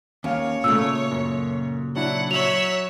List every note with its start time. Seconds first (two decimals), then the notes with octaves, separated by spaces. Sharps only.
0.24 D#2 C#4 C#5 F5
0.64 A#2 C#3 A3 E6
1.11 F#2
1.96 F#3 D4 E4 F#5
2.31 F#3 C#5 E5 F7 F#7